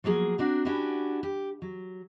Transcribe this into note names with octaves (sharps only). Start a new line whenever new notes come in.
F3 F#3 A#3 G#4
C4 D4 F#4 A#4
C#4 D4 E4 F#4 G4
G4
F#3